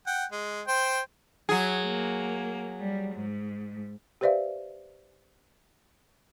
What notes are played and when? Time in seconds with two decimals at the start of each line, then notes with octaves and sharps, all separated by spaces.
0.07 F#5 G5
0.31 G#3
0.68 C5 G5
1.49 F#3 G#4
1.84 A#3
2.80 G3
3.16 G#2
4.21 G4 B4 C5 D5 E5 F5